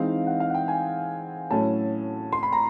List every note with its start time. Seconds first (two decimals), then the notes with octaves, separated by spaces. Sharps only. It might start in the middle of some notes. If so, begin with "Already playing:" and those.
Already playing: E3 G#3 C4 D#4 F5
0.27 F#5
0.40 F5
0.50 F#5
0.54 G5
0.68 G#5
1.50 A2 F#3 A3 C#4 A5
2.33 C6
2.43 B5
2.52 A#5